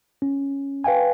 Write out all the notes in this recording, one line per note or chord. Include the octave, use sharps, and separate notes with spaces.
C#4
B4 F5 G5 G#5